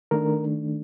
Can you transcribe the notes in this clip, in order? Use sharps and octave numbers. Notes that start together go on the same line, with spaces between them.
D#3 A3 D4 A#4